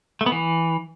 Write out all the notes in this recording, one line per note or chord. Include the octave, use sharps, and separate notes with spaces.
A3
B3
E3